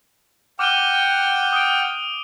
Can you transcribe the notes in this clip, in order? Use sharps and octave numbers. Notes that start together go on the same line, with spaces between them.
F#5 G5 D6 F6 D#7 G7
D#6 D7